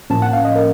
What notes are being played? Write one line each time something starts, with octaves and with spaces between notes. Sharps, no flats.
A2 F3 A#3 C#4 A5
F#5
F5
D#5
A#4